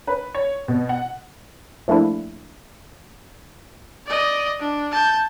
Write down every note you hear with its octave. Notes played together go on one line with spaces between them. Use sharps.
B4
C#5
B2
F#5
F3 A3 A#3 D4 E4
D5 D#5
D4
A5 G6